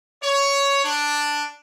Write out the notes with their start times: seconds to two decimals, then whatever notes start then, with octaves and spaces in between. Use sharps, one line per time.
0.23 C#5
0.84 D4